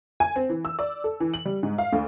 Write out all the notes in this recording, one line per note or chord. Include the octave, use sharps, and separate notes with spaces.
G#5
C4
E3
E6
D5
A4
E3
F#7
G3
G#2
F5
D2